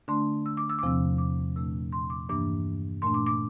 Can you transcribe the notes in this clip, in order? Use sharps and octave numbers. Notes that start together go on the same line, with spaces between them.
D3 A3 D4 C6
E6
D6
E6
D6
E2 C3 F3 C4 E6
D6
A#2 A3 D4 E6
C6
D6
G2 E3 A#3 D4 D6
A#2 A3 D4 C6
D6
D6